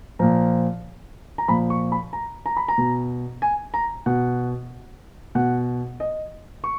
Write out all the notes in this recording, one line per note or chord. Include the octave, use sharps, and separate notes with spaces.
A#2 F3 A#5
A#5
A#2 F3 B5
C#6
B5
A#5
A#5
B5
A#5
B2
G#5
A#5
B2 F#5
B2 F#5
D#5
C#6